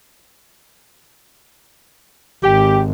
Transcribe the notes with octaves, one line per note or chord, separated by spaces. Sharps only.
G#1 G4